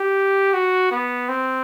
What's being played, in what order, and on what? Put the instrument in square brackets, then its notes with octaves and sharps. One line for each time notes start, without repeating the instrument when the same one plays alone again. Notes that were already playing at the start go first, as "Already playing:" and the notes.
Already playing: [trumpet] G4
F#4
B3
C4